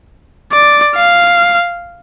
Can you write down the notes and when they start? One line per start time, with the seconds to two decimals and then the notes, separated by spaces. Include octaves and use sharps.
0.52 D5
0.96 F5